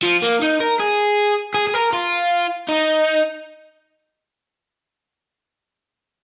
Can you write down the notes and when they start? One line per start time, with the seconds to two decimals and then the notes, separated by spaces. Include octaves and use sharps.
0.03 F3
0.22 A#3
0.42 D#4
0.60 A#4
0.80 G#4
1.54 G#4
1.67 G#4
1.74 A#4
1.93 F4
2.69 D#4